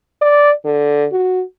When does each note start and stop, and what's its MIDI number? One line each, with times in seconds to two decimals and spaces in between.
0.22 0.52 74
0.65 1.07 50
1.12 1.43 66